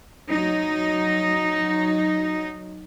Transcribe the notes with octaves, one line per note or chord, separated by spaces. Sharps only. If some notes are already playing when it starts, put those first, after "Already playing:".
F#3 D#4